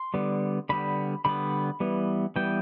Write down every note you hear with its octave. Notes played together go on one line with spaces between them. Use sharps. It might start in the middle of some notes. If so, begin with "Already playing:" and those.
Already playing: C6
D3 G3 B3
D3 G3 B3 B5
D3 G3 B3 B5
E3 G3 B3
E3 G3 B3 G5